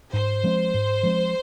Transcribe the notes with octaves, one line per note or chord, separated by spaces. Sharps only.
G#2 C5
F3 G#3 C4
G#2
F3 G#3 C4